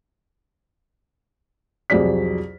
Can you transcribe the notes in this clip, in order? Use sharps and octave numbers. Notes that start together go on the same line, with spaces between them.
C2 F2 F#3 G#4 D5 B6